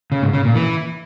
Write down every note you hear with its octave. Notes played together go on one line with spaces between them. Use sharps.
C#3
G#2
C#3
A#2
E3